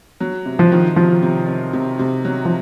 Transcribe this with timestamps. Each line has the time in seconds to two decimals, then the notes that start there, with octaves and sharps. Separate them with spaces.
0.20 F#3
0.46 C3
0.59 F3
0.72 D#3
0.96 C3 F3
1.22 C3
1.48 C3
1.73 C3
1.99 C3
2.25 F#3
2.45 F3